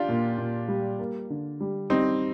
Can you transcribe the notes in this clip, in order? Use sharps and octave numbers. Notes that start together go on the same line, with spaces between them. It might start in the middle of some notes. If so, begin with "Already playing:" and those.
Already playing: D4 F4 G4
A#2
A#2
G3
A#3
D3
G3
G3 C4 D#4